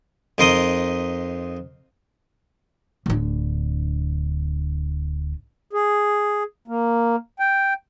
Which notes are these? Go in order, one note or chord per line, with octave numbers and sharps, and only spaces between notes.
F2 D#4 A#4 C6 D#6
D1 D3
G#4
A#3
G5